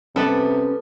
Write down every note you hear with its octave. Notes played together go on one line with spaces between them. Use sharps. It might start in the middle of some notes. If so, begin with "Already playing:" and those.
C3 G3 B3 C#4 A4